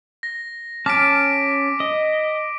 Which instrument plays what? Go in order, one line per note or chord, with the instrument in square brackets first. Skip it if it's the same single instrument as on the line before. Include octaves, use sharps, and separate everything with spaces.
[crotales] A#6
[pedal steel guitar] C#4 A5 F6 [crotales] D6 B6 D7
[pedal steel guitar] D#5